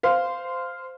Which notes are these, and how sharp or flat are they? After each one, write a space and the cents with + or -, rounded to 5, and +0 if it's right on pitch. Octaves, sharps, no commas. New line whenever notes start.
C5 -15 F5 +0